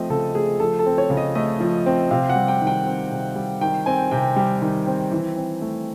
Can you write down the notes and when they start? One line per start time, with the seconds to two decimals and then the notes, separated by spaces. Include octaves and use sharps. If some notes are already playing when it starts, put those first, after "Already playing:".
Already playing: F3 A3 C4 D#5
0.10 C#3 A4
0.34 A3 G#4
0.60 F3 A4
0.79 A4
0.86 C4
0.98 C#5
1.10 C#3
1.17 D#5
1.35 A3 D#5
1.60 F3
1.86 C4
2.11 C3 F5
2.29 F#5
2.36 G3
2.48 G5
2.61 D#3
2.67 G5
2.86 C4
3.10 C3
3.36 G3
3.61 D#3 G5
3.86 C4 G#5
4.11 C3 G5
4.36 G3
4.62 D#3
4.87 C4
5.12 E3
5.37 C4
5.62 A3